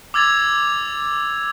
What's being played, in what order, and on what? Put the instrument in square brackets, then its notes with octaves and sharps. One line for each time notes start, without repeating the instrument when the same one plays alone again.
[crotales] D6 E6 G#6 A6 F7